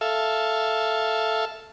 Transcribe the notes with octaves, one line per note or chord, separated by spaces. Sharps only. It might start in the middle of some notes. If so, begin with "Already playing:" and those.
A4 E5 F5